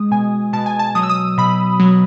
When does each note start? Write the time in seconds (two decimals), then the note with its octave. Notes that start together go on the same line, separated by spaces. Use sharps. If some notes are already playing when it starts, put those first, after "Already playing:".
Already playing: G#3 D#6
0.11 B2 G#5
0.53 B2 A5
0.66 G#5
0.79 A5
0.95 F#3 D#6
1.03 E6
1.10 D#6
1.38 B2 B5
1.80 F#3